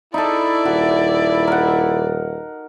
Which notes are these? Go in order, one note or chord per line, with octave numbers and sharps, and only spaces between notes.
D#4 E4 A4 D5
D#1 F#4
A#4 F#5